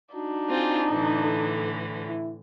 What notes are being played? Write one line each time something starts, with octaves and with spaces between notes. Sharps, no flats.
D4 D#4 F#4
C4 F4 G#4
A2 D3 E3
A4
E4